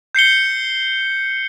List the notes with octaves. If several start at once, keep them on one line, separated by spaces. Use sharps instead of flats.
G6 C7 C#7 G7